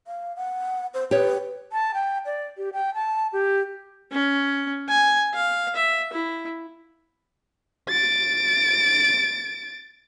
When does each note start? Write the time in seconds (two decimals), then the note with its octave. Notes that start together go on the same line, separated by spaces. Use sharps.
0.07 F5
0.36 F#5
0.94 C5
1.11 G4 B4 C#5
1.72 A5
1.94 G5
2.26 D5
2.57 G4
2.73 G5
2.94 A5
3.33 G4
4.12 C#4
4.89 G#5
5.34 F5
5.76 E5
6.13 E4
7.89 A6 D7